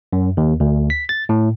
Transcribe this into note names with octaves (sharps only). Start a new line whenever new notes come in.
F#2
D#2
D2
B6
A6
A2